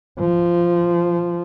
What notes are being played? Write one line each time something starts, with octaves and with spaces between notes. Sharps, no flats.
F3